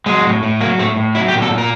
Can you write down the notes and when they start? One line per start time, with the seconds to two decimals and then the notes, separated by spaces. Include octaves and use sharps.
0.06 F#3 G#3
0.25 A2
0.43 A2
0.61 F#3 A#3
0.79 A2 A3
0.97 A2
1.15 F#3 E4
1.28 G4
1.33 A#2
1.42 A4
1.50 A#2
1.58 A#4